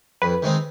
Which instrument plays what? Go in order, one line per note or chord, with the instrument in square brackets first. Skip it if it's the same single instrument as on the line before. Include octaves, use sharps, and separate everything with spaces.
[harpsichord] F2 [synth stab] B4
[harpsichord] D#3 G#3 C4 D#4